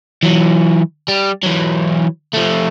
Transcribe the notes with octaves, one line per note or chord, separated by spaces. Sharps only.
E3 F#3
G3
E3 F#3
F3 A3